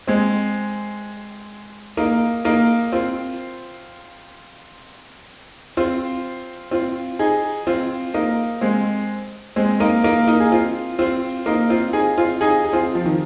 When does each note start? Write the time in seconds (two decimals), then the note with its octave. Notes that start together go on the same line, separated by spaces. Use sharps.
0.08 G#3 C4
1.97 A#3 D#4
2.45 A#3 D#4
2.92 C4 F4
5.77 C4 F4
6.71 C4 F4
7.19 D#4 G#4
7.67 C4 F4
8.14 A#3 D#4
8.61 G#3 C4
9.56 G#3 C4
9.80 A#3 D#4
10.04 A#3 D#4
10.27 A#3 D#4
10.40 G#4
10.51 C4 F4
10.98 C4 F4
11.46 A#3 D#4
11.70 C4 F4
11.93 D#4 G#4
12.18 C4 F4
12.41 D#4 G#4
12.64 G#4
12.73 C4 F4
12.95 F3
13.05 D#3